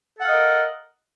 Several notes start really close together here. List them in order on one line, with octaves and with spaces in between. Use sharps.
A4 F#5 F5 D#5 A#4